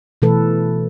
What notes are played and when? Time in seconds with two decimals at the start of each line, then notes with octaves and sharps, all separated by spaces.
0.22 B2 E3 A3 A4 B4